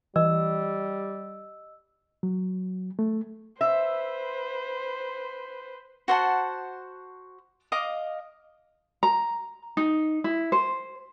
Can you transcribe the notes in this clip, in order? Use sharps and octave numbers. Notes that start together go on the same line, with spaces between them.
E3 G3 D#5 E6
F#3
A3
B4 C5 E5
F#4 C5 F#5 A5
D#5 F5 D6 D#6
A#5
D#4
E4
C5